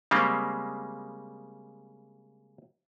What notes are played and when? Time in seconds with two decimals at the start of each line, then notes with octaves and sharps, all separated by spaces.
0.11 C#3 G3 G#3 A#3 C4